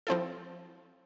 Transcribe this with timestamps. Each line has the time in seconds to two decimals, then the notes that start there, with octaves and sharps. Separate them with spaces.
0.07 F3 C4 E4 A4